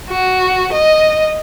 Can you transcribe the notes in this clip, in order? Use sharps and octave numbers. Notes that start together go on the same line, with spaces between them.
F#4
D#5